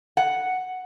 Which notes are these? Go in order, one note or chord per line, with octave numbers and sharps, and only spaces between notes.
F#5